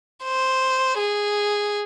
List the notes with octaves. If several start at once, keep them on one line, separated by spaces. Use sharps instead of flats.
C5
G#4